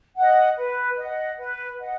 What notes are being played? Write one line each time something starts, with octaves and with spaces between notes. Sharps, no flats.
D#5 F#5
B4
D#5 F#5
B4
D#5 F#5